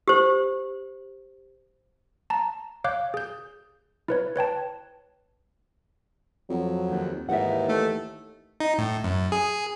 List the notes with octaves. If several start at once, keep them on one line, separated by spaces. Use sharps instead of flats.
G4 C5
A5 A#5
C#5 F5 D6 F#6 G6
G#4 G6
E4 B4 C#5
B4 C#5 G5 A5
F2 F#3
D#2
D#2 G#2 E3 E5 F#5
A3
D#4
A2
F#2
G#4